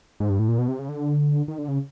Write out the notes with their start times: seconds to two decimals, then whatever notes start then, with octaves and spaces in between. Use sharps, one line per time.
0.20 G#2
0.30 G2
0.39 A2
0.48 A#2
0.58 B2
0.68 C3
0.79 C#3
0.89 D3
1.48 D#3
1.58 D3
1.68 C#3